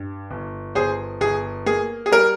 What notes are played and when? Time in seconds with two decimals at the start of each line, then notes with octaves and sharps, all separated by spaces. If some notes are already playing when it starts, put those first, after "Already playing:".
Already playing: G2
0.31 G1
0.75 G1 G#4 C5
1.21 G1 G#4
1.66 A#3 G#4
2.06 G#4
2.11 G3 A#4